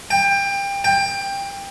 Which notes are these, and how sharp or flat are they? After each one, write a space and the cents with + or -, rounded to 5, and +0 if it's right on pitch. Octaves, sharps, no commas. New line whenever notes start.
G5 +25
G5 +20